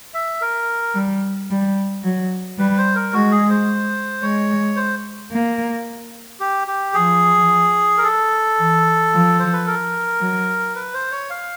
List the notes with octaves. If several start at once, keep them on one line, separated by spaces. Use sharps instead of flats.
E5
A#4
G3
G3
F#3
G3 B4
C5
A#4
G#3 F#4
G#4
C5
G#3 C#5
C5
A#3
G4
G4
F3 G#4
A#4
A4
E3
F3
C5
B4
A#4
F#3
B4
C5
C#5
F5